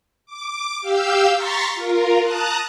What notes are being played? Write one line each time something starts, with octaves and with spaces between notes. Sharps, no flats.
D6
G4 F5 E6 G6
A#5 C6 C#6 A6 B6
F4 A#4
A5 A#5 D#6 F#6